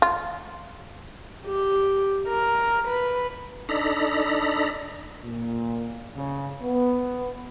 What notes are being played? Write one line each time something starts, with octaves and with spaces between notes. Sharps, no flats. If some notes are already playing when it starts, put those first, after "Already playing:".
F4
G4
A#4
B4
D4 D#4 A4 A#5 B5
A#2
C#3
B3